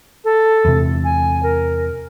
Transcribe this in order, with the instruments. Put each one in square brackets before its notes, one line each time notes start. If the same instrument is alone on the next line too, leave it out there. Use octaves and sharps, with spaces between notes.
[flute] A4
[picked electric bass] E2 C3
[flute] G#5
A#4